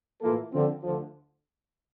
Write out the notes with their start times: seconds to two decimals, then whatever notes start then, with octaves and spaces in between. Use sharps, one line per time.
0.21 A2 E3 A#3 F4 A4
0.52 D3 F3 C4
0.84 D2 D3 F3